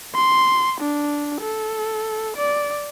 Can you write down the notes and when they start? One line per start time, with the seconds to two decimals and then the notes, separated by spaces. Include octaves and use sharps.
0.15 C6
0.81 D4
1.41 A4
2.37 D5